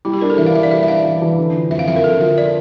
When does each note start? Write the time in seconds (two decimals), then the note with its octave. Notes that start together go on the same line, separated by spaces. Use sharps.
0.05 G3 E4
0.14 G4
0.21 D4 A#4
0.30 A4
0.38 E3 E5
0.46 F5
0.54 E3 E5
0.63 D5
0.71 G3 E5
0.83 E5
0.88 D4 F5
1.04 E3
1.22 E3
1.38 D3
1.54 F3
1.70 F2 E5
1.79 F5
1.88 F2 E5
1.96 A#4
2.04 D3 A4
2.21 F3 E5
2.38 D5